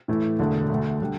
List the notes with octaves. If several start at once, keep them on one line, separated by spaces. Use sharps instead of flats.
A2 E3 A3 E4
E1 E2 D3 A3
D2 D3 A3
D3 G3